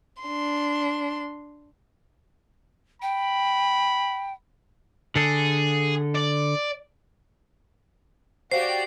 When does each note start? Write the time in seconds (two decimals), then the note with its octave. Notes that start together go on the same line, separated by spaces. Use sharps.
0.23 D4 C6
3.02 G5 B5
5.16 D3 G#4 A4
6.15 D5
8.52 F#4 G4 C5 D5 F5 C7